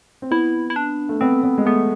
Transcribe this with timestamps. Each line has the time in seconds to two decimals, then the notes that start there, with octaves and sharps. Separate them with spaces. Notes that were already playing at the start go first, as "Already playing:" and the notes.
0.22 C4
0.31 B3 E4
0.70 E4
0.76 D4
1.09 A3
1.21 B3 C4
1.44 B3
1.58 G#3
1.66 A3 B3